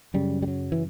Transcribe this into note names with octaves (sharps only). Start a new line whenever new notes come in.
F#2 C#3 G3
G3
F#3
E3